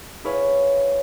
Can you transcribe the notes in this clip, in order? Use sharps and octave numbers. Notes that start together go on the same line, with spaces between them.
E4 G#4 B4 C#5 F5